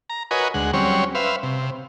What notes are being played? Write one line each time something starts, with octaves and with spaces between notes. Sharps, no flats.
A#5
F#4 A#4 B4 C#5 D#5 G#5
D2 G#3 F#5
F#3 G3 C4 C#4 C#5
B4 C5 E5 F5
C3